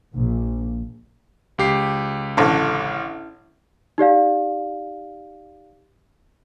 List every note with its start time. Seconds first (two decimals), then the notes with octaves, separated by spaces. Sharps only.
0.13 A#1
1.58 C#2 G4 C7
2.37 A1 D3
3.98 D#4 G4 D5 F5